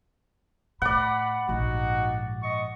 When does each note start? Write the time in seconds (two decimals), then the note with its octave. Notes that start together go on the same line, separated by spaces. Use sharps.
0.82 A2 D5 F#5 B5
1.49 A#1 G#2 D#4 F#4
2.41 D#5 C#6